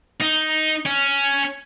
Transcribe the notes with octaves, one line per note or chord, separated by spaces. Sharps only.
D#4
C#4